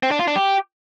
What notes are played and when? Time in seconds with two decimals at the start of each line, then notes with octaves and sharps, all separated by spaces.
0.03 C4
0.11 D4
0.19 F4
0.27 D4
0.36 G4